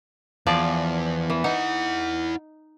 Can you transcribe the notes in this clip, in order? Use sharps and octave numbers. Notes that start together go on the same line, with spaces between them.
E2 F3 D5
E3
D#4 E4 F#5